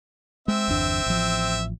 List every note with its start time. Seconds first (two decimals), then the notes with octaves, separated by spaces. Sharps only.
0.48 G#3 C4 E5
0.68 G1 E2 D4
1.06 A1 F3